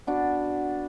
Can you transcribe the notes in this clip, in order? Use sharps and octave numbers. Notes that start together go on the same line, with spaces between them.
B3 D4 F#4